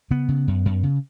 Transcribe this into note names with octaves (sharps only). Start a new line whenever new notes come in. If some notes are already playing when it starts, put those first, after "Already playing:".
C#3 B3
C#3
F#2
F#2
C#3